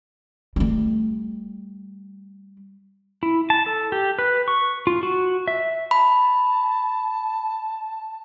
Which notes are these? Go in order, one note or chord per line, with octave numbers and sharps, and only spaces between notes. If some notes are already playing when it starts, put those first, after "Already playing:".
G3 A3
E4
A5
A4
G4
B4
C#6
F4
F#4
E5
A5 B5